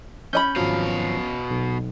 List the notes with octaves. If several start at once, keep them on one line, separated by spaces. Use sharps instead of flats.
C#4 D#5 B5 G6
G#1 B2 F3 F#3 F5
B1